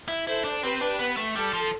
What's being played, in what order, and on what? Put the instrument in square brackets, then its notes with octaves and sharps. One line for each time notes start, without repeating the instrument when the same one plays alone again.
[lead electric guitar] E4
[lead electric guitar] E4 [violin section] A4 C5
[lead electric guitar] D4
[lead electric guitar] C4 [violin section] G4 B4
[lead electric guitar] D4
B3
A3
[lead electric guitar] G3 [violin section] A4
[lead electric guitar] F3